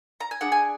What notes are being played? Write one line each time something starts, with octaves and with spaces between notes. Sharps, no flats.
A#5
G#5
D4 G#4 F#5
G#5